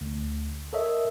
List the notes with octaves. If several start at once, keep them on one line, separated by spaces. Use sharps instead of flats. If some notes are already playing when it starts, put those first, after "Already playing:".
D2
A4 A#4 C#5 D#5 E5